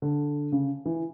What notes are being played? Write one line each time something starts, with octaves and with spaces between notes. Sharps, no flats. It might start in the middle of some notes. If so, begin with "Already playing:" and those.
D3
C#3
E3